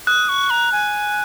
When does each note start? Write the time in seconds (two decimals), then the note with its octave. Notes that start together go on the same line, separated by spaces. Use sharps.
0.07 D#6 F#6
0.29 C#6
0.50 A#5
0.72 G#5